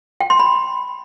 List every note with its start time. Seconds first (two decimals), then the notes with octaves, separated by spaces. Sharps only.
0.21 G5
0.30 C6
0.39 B5